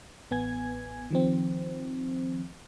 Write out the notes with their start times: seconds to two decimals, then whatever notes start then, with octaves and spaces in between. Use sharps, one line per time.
0.31 A1 B3 G#5 G#6
1.11 D#3 F3 C4